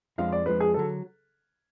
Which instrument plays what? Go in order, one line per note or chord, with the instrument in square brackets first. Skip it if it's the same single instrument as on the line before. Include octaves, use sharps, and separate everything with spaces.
[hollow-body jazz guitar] F2 F3 G#3 D4 [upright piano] F5
[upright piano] D5
[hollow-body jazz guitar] F2 F3 G#3 D4 [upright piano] B4
[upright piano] G#4
[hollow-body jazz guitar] D3 F#3 [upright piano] A4